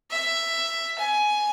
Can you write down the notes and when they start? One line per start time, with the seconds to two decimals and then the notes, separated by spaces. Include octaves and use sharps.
0.11 E5
0.99 G#5